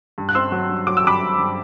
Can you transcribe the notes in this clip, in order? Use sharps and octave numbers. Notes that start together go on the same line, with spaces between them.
G2
F#6
C4 C6 E6
F#3
G2
F#3 D6
E6
G2 B5 D6
G2
G2